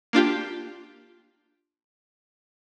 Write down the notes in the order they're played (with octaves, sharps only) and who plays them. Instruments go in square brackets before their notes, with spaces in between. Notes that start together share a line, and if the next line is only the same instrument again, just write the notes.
[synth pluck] A#3 D4 F4 G4